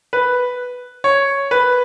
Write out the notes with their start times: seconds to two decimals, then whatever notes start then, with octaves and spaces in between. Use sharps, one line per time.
0.13 B4
1.04 C#5
1.51 B4